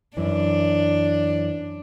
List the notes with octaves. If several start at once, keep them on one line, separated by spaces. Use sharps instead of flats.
F#2 E3 D4